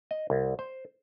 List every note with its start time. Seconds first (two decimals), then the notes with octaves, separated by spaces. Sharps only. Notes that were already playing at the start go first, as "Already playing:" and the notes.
0.11 D#5
0.30 C2
0.59 C5